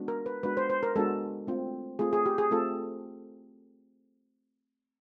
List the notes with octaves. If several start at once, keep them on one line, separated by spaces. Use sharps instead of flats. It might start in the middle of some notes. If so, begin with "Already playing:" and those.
Already playing: G#3 B3 D4 F#4
A#4
B4
G#3 B3 D4 F#4 B4
C5
C5
A#4
G#3 B3 D4 F#4 A4
A3 C4 F4
A3 C4 F4 G#4
G#4
G4
G#4
A3 C4 F4 A4